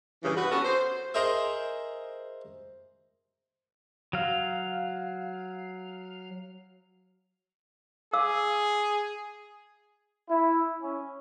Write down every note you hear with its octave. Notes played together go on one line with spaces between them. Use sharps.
G2 A#2 C#3 E3
F#4 B4
B3 C#4 F#4 G4 A4
C5
G#4 A#4 C5 D#5 E5
F#3 F5
G#4 F5 D6 E6
E4
C#4